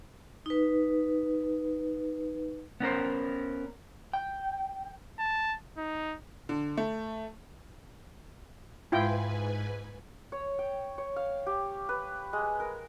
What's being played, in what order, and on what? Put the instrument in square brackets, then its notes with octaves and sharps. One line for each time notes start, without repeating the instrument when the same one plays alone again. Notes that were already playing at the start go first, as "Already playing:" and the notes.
[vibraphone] D#4 B4
[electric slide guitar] B3 C#4 A#4 C5
G5
[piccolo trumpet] A5
D#4
[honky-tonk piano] D3
A3
[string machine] G#2 B4 G#5 [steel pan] E4 F4 G5
[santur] C#5
G5
C#5
F5
G4
B4
G#3
A#4